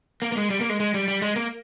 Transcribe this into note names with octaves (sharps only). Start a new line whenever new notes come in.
A#3
A#3
G#3
G3
A#3
G#3
G#3
G3
G3
G#3
A#3